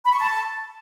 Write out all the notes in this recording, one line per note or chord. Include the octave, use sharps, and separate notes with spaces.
B5
C#6
A5